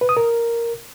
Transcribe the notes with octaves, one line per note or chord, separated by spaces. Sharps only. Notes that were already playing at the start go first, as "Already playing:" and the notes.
B4
D#6
A#4